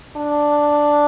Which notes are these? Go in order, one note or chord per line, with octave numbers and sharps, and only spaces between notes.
D4